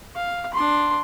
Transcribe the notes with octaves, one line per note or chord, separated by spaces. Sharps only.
F5
D4 C6